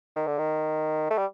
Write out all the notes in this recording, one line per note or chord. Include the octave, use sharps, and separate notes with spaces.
D#3
D3
D#3
A3
G3